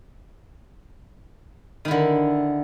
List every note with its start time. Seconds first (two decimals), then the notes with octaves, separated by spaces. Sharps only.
1.85 D#3
1.88 E4
1.91 D3